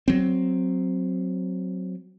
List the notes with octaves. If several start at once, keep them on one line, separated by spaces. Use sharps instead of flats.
F#3 C4